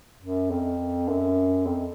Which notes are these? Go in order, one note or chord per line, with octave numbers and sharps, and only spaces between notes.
F#2
F2
F#2
F2